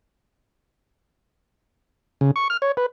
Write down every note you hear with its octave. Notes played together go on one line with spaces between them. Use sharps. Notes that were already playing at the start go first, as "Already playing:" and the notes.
C#3
C#6
F6
C#5
B4